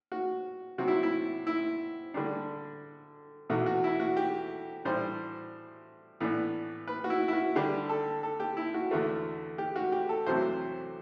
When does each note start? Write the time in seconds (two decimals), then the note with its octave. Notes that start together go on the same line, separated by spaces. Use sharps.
0.12 F#4
0.78 C3 F#3 C4 F#4
0.88 E4
1.03 E4
1.47 E4
2.14 D3 G3 D4
3.50 E2 B2 A3 F#4
3.66 F#4
3.84 E4
4.00 F#4
4.17 G4
4.85 A2 E3 G3 D4 C5
6.20 A2 E3 B3 D4
6.87 B4
7.04 F#4
7.10 E4
7.28 E4
7.33 F#4
7.56 D3 G3 D4 G4
7.89 A4
8.23 A4
8.40 G4
8.57 E4
8.74 F#4
8.91 E2 D3 A3
9.58 G4
9.76 F#4
9.92 G4
10.09 A4
10.26 E2 C3 F#3 A3 C4 C5